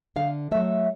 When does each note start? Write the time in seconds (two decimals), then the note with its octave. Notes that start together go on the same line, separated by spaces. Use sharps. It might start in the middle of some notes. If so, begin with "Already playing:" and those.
0.16 D3 F5
0.51 F#3 A3 E5